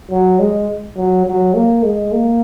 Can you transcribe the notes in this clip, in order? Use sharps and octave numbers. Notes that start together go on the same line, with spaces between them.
F#3
G#3
F#3
F#3
A#3
G#3
A#3